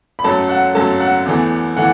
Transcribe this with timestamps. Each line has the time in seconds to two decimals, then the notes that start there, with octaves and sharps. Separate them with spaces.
0.19 B5
0.24 F#2 F#3 A3 A4 A5
0.49 F#5
0.75 F#2 F#3 A3 A4 A5
1.00 F#5
1.26 E2 E3 A3
1.77 E3 A3 F#5